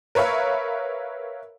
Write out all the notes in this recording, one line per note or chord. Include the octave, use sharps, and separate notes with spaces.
A#4 B4 C#5 E5 F5